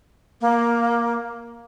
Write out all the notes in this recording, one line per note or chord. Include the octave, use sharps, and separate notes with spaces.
A#3